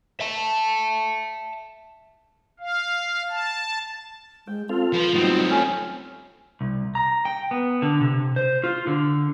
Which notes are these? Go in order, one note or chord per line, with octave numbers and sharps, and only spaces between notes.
E5 A5
F5
A5
G#3 G5
C4 F4 A4 F5
F3 B4
A2 F#3 G3 B3 C4 D#4
A3 C#4 E5
C2
A#5
G5
B3
D3
C3
C5
F4
D3